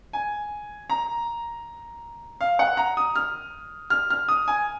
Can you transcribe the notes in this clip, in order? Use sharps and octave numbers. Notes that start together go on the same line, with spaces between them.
G#5
A#5
F5
F#5
A#5
D#6
F6
F6
F6
D#6
G#5